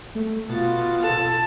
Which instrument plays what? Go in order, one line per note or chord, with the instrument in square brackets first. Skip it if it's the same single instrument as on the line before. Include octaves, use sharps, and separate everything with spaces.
[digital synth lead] A3
[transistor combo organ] B2 [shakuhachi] F4 [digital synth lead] A6
[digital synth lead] A4 [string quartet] A5